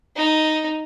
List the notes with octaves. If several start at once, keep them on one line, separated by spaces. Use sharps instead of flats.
D#4